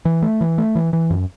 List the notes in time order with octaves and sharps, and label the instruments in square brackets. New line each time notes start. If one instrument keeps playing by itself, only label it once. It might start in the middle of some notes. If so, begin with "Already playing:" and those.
[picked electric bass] E3
A3
E3
A3
E3
E3
F#2